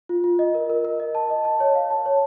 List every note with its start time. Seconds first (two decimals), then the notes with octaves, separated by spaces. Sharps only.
0.09 F4
0.24 F4
0.39 D#5
0.55 A#4
0.70 A#4
0.85 A#4
1.00 D#5
1.15 A5
1.30 D#5
1.45 A5
1.60 C#5
1.75 F5
1.90 A5
2.06 C#5